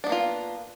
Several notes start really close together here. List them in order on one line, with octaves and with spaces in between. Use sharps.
D4 B3 A#3 F4